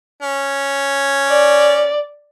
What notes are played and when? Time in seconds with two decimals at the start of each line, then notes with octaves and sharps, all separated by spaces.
0.22 C#4
1.28 D5